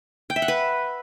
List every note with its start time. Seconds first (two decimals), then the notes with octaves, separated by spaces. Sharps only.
0.30 G5
0.36 E5
0.42 F#5
0.48 B4